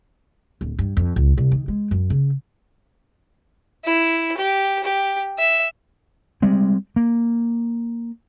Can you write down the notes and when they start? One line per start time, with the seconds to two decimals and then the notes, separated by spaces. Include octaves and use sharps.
0.61 D1
0.79 G2
0.97 F2
1.16 C#2
1.38 C2
1.52 D#3
1.68 G#3
1.91 F#2
2.10 C#3
3.85 E4
4.37 G4
4.84 G4
5.38 E5
6.42 G3 G#3 C4
6.96 A#3